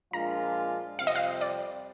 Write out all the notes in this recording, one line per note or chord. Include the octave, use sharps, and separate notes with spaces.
A#2 F3 G#3 D4 F4 A#5
F2 C3 G3 C4 F5
D#5
F5
D5